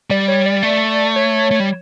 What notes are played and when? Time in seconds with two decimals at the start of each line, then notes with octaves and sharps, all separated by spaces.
0.10 G3 D5
0.28 C#5
0.46 D5
0.63 A3
1.16 C#5
1.51 A3
1.60 G3